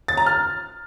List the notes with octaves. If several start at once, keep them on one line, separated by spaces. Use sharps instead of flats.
A6
A#5
F6